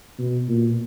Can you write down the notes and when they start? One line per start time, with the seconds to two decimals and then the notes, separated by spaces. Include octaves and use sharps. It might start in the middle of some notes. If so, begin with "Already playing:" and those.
0.19 B2
0.48 A#2